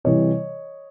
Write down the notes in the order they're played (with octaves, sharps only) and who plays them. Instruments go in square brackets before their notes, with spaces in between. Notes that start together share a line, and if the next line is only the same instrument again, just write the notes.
[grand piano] C3 E3 G3 C#5 D#5